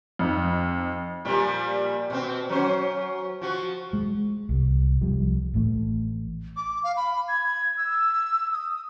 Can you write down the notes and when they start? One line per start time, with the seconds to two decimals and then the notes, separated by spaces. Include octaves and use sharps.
0.19 F2 D#4
1.25 A#2 F3 G3
2.10 B2 C4
2.50 F#3 C#4 C5
3.41 F3 F#4
3.93 G#3
4.49 C2
5.01 C2 F3 G3
5.54 A1 A3
6.56 D6
6.84 F5
6.97 B5
7.28 G#6
7.77 E6
8.53 D#6